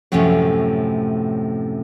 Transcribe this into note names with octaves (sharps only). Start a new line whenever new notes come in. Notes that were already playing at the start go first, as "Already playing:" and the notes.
F#2 A2 C3 F3 A3 C#4